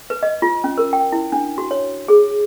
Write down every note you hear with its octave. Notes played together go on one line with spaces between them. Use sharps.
B4
D#5
F4
C#4
A#4
G5
E4
D4
F#4
C#5
G#4